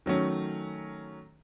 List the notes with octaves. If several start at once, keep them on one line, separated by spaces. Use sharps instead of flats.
D#3 F#3 A3 C#4